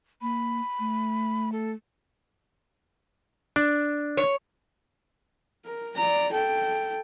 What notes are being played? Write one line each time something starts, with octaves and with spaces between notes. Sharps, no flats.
A#3 B5
A3
A4
D4
C#5
A#4
D5 A#5
A4 G5